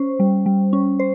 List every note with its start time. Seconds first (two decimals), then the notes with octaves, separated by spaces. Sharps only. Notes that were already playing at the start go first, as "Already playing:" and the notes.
Already playing: C#4 C5
0.20 G3
0.46 G3
0.73 C#4
0.99 C5